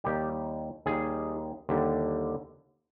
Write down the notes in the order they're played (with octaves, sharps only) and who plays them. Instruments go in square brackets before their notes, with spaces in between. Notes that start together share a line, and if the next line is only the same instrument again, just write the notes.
[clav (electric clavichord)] D#2 D#3 G3 G4
D#2 D#3 G3 G#4
D#2 D3 G3